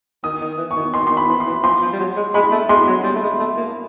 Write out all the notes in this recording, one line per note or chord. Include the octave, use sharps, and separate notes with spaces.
D#3 D#6
D#3
E3
C#6
D#3
D#3 C6
D#3 C6
B5
E3
C6
E3
F3 C6
F3
G3
F#3
G#3
G#3 B5
A3
G#3 C6
F#3
G3
A3
G#3
A3
A#3